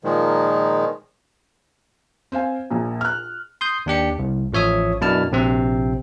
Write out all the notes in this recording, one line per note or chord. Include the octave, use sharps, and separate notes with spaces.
A#2 D#3 F3 G#3
C4 C5 F5 G#5
A#1 A#2
F6 F#6
C6 D#6 G6
D#2 D4 G4 C#7
C2
A1 F3 C#5 E5 D#6
F#2 B2 D4 E4 A5 F6
A#1 C3 C4